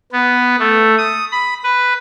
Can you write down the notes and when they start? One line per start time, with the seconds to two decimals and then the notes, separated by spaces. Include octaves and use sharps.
0.12 B3
0.60 A3
0.98 D#6
1.32 B5
1.63 B4